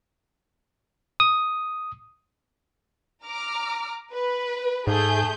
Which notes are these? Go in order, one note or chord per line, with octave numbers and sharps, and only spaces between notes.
D#6
A#5 D6 F6
B4
G#2 A3 G#4 G6